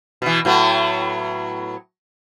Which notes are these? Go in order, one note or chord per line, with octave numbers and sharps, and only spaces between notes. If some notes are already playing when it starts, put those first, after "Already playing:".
B2 E3
A2 F#3 B3